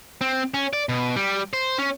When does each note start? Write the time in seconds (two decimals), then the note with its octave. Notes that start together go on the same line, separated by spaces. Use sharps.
0.21 C4
0.54 C#4
0.73 D5
0.89 B2
1.16 G3
1.53 C5
1.78 C#4